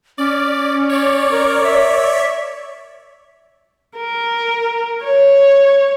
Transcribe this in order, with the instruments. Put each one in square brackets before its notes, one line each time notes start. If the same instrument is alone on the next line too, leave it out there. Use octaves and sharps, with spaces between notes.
[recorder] C#4 [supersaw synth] D5
[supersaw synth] C#5 D5
[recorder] A#4
E5
[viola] A#4
C#5